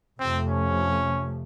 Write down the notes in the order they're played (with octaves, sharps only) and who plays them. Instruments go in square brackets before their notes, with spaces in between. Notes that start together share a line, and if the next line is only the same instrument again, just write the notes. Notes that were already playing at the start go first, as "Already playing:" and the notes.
[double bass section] F2 C3 F3 A3 [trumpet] C4
[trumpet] C#4